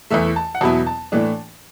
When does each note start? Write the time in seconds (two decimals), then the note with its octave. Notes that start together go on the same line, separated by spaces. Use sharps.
0.11 E2 E3 A3 E5
0.36 A5
0.55 F#5
0.61 E2 B2 F#3 B3 E4 A5
0.87 A5
1.12 A2 E3 A3 D4